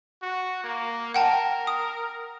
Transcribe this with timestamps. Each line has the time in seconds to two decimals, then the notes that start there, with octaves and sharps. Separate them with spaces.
0.22 F#4
0.64 A#3
1.14 A#4 F#5 G5 A5
1.67 D#6